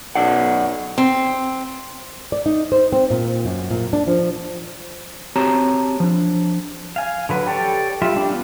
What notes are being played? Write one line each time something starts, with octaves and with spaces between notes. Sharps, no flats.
B1 F#2 D5 F#5
C4
D5
D#4
C5
C4
A#2
F#2
A#2
D4
F3
C4 F#4 G4 C#5 A5 A#5
F3 D4
F5 G#5
D3 F#3 B4
G4 A4 C#5 D5
G3 F4 E5
G3 D4
B3 D4 F4